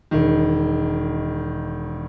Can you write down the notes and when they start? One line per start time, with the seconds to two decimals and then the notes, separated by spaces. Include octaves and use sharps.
0.11 E1 D#3